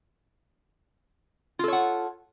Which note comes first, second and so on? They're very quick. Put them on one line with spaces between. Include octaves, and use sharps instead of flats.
F4 A4 C#5 F#5